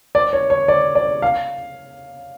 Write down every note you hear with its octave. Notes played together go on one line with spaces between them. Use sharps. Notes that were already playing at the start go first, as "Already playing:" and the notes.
D5
C#5
C#5
D5
D5
F5